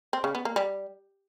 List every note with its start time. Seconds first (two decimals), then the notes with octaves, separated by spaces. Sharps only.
0.13 C4
0.24 C#3
0.35 B3
0.45 A#3
0.56 G3